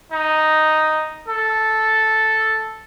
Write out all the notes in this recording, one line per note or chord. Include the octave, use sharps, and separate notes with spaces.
D#4
A4